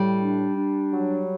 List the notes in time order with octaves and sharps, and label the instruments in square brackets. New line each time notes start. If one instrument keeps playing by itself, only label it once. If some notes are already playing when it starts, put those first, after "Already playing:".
Already playing: [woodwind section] A2 [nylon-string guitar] G3
[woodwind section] D4
D4
F#3